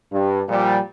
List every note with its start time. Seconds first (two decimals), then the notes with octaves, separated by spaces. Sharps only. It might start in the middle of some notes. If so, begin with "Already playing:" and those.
0.13 G2
0.49 A#2 F3 G3